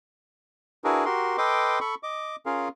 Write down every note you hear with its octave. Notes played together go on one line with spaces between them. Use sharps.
D4 E4 F#4 G#4 A#4 B4
F#4 G4 A#4 C6
A4 B4 D#5 G5 C6 D6
A4 B5 C#6
D#5 D6
C#4 F4 G#4 A#4 F5